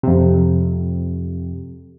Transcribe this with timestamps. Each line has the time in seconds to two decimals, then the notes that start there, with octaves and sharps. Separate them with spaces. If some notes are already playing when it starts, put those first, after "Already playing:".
0.03 F2 C3